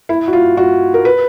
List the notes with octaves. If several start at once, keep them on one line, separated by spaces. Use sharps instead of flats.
E4
F#4
F4
F#4
A#4
B4